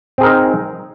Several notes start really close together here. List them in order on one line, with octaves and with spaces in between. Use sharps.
C4 G#4 A#4 D#4